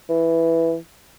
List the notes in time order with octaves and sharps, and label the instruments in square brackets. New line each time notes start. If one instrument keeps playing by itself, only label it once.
[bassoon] E3